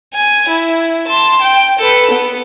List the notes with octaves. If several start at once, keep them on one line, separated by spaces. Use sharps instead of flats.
G#5
E4
A5 C6
G5
A4 B4
B3